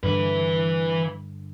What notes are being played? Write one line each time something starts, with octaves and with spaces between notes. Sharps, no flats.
G2 D3 E3 B4